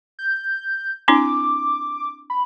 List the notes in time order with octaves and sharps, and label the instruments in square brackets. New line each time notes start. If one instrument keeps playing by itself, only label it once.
[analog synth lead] G6
[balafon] C4 D4 E4 [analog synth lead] D6
[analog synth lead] B5